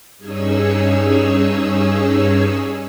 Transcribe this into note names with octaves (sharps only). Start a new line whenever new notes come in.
G2 C#4 D#4 G#4 C#5 E6